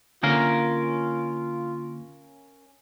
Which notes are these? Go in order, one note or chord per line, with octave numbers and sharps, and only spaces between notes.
D3 A#3 C#4 F4 A#4 F5